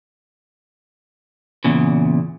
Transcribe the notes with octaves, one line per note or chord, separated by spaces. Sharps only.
E2 A#2 C#3